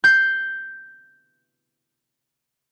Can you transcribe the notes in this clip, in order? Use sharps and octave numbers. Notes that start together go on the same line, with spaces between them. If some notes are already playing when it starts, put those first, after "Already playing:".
G6 C7